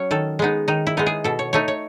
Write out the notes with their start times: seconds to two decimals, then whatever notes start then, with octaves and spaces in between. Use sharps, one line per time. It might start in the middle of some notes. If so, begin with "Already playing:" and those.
Already playing: F#3 C#4 C#5
0.11 D#3 A4
0.39 G#3 B3 D#4
0.68 D#3 D#4
0.87 E4
0.97 G#3 B3 D#4
1.06 G#4
1.24 B2 A4
1.39 C#5
1.53 A3 D#4 C#5
1.68 C#5